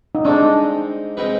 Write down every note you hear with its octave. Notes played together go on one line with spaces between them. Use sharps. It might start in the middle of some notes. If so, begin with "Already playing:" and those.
D#4
G#3 C4 D4 D#4
G#3 C4 D#4 G#4 B4